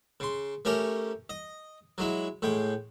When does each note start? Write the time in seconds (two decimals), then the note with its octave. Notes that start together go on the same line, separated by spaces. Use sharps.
0.20 C#3 C6
0.65 A3 C#4 G4 A#4
1.30 D#5
1.98 F#3 G#3 E4
2.42 A2 G#3 G5